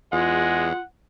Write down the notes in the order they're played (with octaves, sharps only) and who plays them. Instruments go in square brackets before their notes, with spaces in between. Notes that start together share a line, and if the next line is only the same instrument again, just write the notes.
[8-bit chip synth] E2 [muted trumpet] G#3 [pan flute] F4 [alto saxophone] F#5